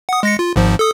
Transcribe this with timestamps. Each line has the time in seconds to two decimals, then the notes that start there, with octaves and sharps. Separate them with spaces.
0.09 F#5 D#6
0.23 G#3 A#6 C#7
0.39 F4
0.56 G#1 G#2 F3
0.79 A4 D#6